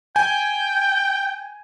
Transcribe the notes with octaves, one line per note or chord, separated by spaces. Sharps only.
G5 G#5